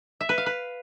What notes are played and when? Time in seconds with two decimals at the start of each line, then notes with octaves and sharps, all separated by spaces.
0.21 E5
0.29 B4
0.38 F5
0.46 B4